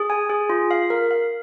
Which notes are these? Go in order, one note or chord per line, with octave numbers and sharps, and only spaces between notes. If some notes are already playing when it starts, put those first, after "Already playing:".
Already playing: G#4
G#5
G#4
F4
F5
A#4
F5